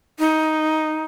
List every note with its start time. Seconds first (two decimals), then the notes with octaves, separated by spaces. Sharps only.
0.19 D#4